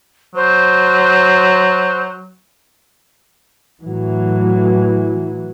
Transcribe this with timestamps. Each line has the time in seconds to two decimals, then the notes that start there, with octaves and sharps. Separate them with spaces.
0.35 F#3 C5
3.82 A2 E3 F#3